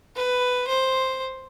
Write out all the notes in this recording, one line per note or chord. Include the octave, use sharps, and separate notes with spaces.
B4
C5